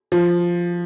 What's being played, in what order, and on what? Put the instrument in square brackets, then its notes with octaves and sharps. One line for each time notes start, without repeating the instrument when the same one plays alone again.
[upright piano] F3